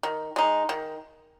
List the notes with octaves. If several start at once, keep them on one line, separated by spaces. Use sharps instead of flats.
D#3
G#3 D#4
D#3